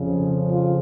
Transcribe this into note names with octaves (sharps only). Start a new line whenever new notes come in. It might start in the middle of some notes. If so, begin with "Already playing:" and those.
Already playing: F2 C#3 F3
F4